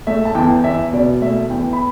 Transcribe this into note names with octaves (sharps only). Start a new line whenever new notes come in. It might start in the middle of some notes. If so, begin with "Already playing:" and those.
A3 E5
A5
E2 G5
E2 E5
B2 D5
A3 E5
E2 G5
B5